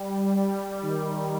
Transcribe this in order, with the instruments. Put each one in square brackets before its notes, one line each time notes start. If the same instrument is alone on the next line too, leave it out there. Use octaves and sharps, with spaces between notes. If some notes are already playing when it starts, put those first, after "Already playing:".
Already playing: [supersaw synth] G3
G3
D#3